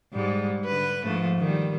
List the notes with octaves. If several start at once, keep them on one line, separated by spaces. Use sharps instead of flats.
G#2 G3 G#3
D3 B4
G#2 F3 A3
D#3 G3